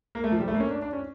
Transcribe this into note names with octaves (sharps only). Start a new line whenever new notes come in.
A#3
A3
F3
G3
A3
A#3
C#4
D4
D4
C#4